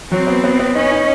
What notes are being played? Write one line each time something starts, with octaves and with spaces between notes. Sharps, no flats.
F#3 C4
B3
B3
B3
C#4 D#4
D#4